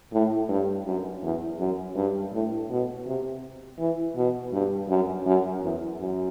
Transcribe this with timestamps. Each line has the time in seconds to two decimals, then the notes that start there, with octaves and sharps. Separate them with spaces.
0.12 A2
0.49 G2
0.85 F#2
1.22 E2
1.59 F#2
1.95 G2
2.32 A2
2.70 B2
3.06 C3
3.79 E3
4.16 B2
4.53 G2
4.89 F#2
5.26 F#2
5.62 E2
6.00 F#2